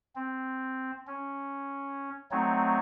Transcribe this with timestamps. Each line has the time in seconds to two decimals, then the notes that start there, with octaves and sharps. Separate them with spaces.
0.16 C4
1.07 C#4
2.31 F#3 A3 C4 D#4 C#5